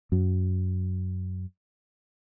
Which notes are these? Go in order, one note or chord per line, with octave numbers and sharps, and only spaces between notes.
F#2 F#3